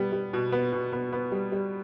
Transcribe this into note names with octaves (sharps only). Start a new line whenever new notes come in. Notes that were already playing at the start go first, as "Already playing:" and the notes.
Already playing: G3 B3
G3
B2
B3
B2
B3
B3
G3
G3